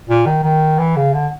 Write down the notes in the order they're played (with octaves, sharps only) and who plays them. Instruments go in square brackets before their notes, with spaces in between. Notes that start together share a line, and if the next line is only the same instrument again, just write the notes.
[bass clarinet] A#2
D#3
D#3
E3
C#3
D3